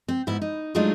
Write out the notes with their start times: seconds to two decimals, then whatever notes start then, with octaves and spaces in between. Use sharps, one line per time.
0.08 C4
0.27 G#2 B3 E4
0.42 D#4
0.75 F#3 G#3 A3 D4 D#4 F4